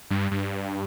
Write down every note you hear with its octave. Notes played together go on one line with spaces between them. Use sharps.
G2
G2